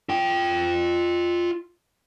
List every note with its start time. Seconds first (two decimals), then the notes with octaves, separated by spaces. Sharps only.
0.09 F4 G5